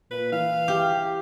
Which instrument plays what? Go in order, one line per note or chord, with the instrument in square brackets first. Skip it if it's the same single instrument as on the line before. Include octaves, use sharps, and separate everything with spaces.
[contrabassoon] A#2 [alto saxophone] B4
[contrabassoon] E3 [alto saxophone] F5
[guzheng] G4